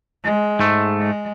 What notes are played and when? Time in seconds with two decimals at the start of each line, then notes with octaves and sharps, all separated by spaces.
0.23 G#3
0.60 G#2 A3
0.99 G#3